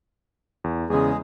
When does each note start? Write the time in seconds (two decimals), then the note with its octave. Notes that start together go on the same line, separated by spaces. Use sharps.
0.64 E2
0.90 E2 C#3 G#3 G#4